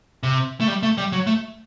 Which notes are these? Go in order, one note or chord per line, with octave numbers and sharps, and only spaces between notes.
C3
A3
G3
A3
G3
F#3
A3